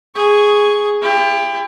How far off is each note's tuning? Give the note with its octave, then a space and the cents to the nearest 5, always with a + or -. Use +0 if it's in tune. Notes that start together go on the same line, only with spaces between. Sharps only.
G#4 +0 C#6 +5
E4 +45 G4 +35